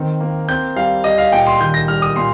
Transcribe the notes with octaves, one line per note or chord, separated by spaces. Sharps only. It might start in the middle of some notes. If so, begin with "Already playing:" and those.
Already playing: D#3 C4
A#3
C4 G6
G3 F5
G3 D#5
F5
A#2 G5
C6
D#3 G6
A#6
G3 F6
D#6
A#2 C6